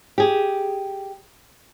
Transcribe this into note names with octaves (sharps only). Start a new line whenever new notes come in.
G4 G#4